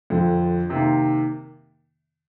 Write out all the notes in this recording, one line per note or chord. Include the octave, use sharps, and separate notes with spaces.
F2 D3 F3
C3 D#3 A#3